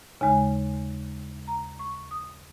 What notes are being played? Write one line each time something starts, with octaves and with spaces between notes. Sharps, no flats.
D#2 C#3 G#3 G#5
A#5
C#6
D#6